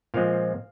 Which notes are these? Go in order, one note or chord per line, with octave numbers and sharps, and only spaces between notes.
A#2 F3 G#3 C4 F5